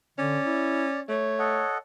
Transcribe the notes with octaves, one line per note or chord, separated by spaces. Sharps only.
D3 C#4 D5
E4
A3 C#5
A4 D#5 F#5